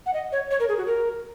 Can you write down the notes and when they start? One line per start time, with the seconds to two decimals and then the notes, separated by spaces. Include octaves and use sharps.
0.06 F#5
0.13 D#5
0.32 C#5
0.51 C#5
0.60 A#4
0.68 G#4
0.78 F#4
0.86 A#4